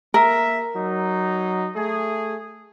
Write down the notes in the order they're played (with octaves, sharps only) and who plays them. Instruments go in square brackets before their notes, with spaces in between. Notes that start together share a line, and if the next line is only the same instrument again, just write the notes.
[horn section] A#3 E5 [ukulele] A#4
[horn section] F#3 D#4
A3 G#4